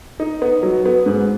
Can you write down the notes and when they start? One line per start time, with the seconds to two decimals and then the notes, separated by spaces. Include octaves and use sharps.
0.20 D#4
0.42 B3
0.63 F#3
0.86 B3
1.06 G#2